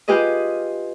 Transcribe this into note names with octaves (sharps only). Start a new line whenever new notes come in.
F4 G4 G#4 B4 D#5